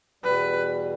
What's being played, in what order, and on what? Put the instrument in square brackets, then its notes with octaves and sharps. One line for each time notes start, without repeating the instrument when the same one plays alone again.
[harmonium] E2 B2 G3 [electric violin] B4